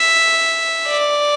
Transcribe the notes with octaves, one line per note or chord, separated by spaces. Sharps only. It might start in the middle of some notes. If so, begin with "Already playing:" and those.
Already playing: E5
D5